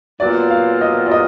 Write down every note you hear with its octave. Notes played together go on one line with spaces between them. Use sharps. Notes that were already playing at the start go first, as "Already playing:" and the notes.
A#2 F#3 B3 F4 D5
F5
D#5
D5
D#5